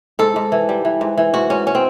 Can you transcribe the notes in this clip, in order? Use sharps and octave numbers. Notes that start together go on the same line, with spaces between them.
G#2 A4
G#2
E3
G3
E3
G#2
E3
G#2 F#4
G#2 C#4
C#4
C4